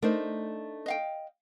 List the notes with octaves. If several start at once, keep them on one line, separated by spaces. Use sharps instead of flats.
A3 D4 D#4 A#4 C5
D#5 F5 G5